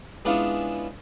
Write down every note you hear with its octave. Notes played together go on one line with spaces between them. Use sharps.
G#3 B3 C#4 D4 E4 F4